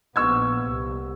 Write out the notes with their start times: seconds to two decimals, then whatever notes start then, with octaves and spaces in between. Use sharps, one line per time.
0.16 A#1 B3 C#6 E6 G#6
0.64 C2